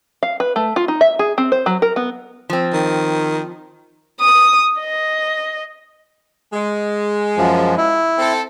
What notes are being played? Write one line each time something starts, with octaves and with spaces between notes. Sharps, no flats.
F5
B4
A3
F4
D#4
E5
G#4
C4
C5
F#3
A#4
B3
F3 C4
D#3
D#6
D#5
G#3
F#2 F3
E4
C4 A4